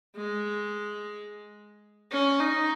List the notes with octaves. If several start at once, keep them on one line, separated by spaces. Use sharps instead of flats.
G#3
C#4
D#4